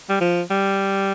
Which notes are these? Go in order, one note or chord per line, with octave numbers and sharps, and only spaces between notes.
G3
F3
G3